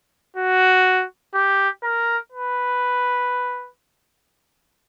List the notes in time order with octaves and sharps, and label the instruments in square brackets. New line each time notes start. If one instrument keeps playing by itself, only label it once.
[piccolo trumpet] F#4
G4
A#4
B4